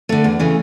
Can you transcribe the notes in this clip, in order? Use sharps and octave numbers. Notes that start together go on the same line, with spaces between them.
D3 A3
E2
C#3 E3 A3